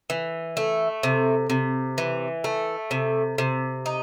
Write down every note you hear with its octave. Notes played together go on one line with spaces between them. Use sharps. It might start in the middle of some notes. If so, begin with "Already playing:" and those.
E3
A3
C3
C3
E3
A3
C3
C3
D#4